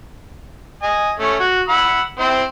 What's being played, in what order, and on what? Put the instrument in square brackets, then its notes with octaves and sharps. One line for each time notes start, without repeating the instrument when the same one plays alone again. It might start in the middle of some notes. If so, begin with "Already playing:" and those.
[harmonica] D#5 G#5
A3 C#4
F#4
F#5 B5 E6
C4 E4 C5